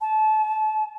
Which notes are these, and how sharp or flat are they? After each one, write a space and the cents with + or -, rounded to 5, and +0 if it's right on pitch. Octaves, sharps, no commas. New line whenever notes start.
A5 -30